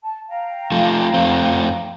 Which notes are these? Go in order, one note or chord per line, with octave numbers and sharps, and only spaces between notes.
A5
F5 G5 A#5
F3 A3
F2 A3 C4